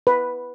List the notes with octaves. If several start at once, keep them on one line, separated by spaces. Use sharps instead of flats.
B4